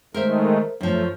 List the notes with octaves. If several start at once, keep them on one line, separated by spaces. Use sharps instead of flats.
D#3 G#3 A3 A#4 C5 E5
F#2 F3 A3